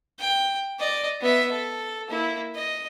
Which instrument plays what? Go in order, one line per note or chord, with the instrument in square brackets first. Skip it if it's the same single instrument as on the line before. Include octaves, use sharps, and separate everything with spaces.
[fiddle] G5
D5 D#5
B3 E5
A4
A#3 E4
D#5